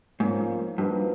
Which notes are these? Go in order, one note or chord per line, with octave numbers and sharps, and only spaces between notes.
G#2 F3 A#3 C#4
G2 F3 A#3 D#4 F#4 B4